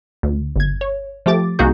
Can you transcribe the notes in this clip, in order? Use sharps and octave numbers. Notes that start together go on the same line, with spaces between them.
D2
G1 G#6
C#5
F3 A3 G4 D6 A6
C2 A#3 D#4 F#4 G#4 G6